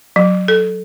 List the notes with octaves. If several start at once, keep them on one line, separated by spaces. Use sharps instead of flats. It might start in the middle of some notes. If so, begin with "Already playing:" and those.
F#3
A4